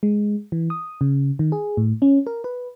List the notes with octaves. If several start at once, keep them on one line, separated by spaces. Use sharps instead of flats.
G#3
E3
D#6
C#3
D#3
G#4
A2
C#4
A#4
B4